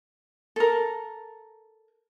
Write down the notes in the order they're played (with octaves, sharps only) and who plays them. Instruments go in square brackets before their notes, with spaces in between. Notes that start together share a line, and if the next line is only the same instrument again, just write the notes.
[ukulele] A4 A#4